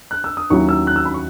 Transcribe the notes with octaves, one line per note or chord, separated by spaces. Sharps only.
F#6
E6
D#6
D#2 D#3 F#3 C#4 E4 C#6
E6
F#6
E6
B5
C#6